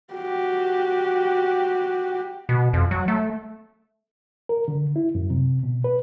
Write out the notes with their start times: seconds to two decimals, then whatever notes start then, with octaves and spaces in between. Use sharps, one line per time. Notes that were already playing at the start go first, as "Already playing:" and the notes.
0.14 F#4 G4
2.49 B2
2.73 F2
2.91 F#3
3.08 A3
4.49 A#4
4.68 D3
4.96 E4
5.15 F#2
5.30 C3
5.63 B2
5.84 B4